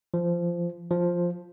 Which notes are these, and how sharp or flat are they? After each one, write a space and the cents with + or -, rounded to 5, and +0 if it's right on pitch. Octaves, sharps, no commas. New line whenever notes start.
F3 -15
F3 +5